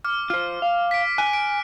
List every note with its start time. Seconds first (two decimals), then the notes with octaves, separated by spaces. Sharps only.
0.04 D6 F6
0.30 F4 C5 F6
0.62 F5
0.91 B6 D7
1.18 G#5 F#6
1.33 F#6 D7